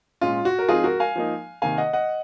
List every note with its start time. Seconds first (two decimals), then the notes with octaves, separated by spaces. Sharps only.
0.21 A#2 G#3 C#4 F4
0.45 F#4
0.59 A#4
0.68 F3 C4 D#4 F4 G#4
0.84 F#4 A#4
1.00 F5 G#5
1.16 F3 A#3 D#4
1.62 C3 D#3 A#3 F5 G#5
1.78 D#5 F#5
1.93 D#5 F#5